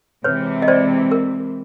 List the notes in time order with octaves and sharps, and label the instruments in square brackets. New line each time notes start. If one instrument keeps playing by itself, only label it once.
[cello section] C3 E3 G#3 C4 [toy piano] B4 C#5
[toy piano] D#5
C5 D5
A#4